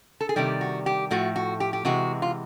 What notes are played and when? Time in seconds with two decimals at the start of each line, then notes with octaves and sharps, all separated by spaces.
0.21 A4
0.29 G#4
0.36 C3 D#3 G3 G4
0.61 F#4
0.86 G4
1.11 A2 F3 A3 F#4
1.36 F#4
1.60 G4
1.73 G4
1.85 C3 E3 G#3 F#4
2.22 F4